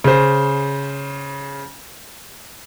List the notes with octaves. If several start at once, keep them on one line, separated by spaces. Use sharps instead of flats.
C#3 C5